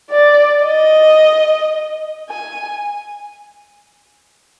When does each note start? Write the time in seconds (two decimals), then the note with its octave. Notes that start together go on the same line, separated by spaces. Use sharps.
0.11 D5
0.65 D#5
2.30 G#5